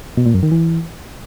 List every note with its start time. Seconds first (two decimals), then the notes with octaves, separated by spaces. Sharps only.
0.17 B2
0.26 A#2
0.34 F#2
0.43 D#3
0.51 E3